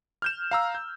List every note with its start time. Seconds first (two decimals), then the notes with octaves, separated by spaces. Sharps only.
0.22 F6 G6 E7
0.51 F5 A#5 E6
0.75 G6